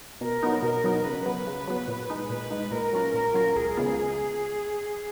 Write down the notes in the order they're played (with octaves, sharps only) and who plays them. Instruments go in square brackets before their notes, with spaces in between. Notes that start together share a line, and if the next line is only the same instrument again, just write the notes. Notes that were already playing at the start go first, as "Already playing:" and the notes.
[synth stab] B2 [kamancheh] A#4
[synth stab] F#3 B3 D#4
[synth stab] B2 [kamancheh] A#4
[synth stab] F#3 B3 D#4
[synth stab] C#3 [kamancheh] B4
[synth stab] F#3 B3
C#3
F#3 B3
A#2
G#3 D#4
[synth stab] A#2 [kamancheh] B4
[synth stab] G#3 D#4
[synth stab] A#2 [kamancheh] A#4
[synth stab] F#3 C#4 F4
[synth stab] A#2 [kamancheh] A#4
[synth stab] F#3 C#4 F4
[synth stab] C#2 [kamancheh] G#4
[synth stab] C#3 G#3 B3 F4